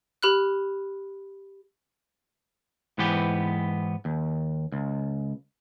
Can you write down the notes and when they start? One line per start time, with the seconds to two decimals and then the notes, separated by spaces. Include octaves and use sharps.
0.23 G4 B5 F6 F#6
2.98 G#2 E3 B3 G4
4.05 D#2
4.72 C#2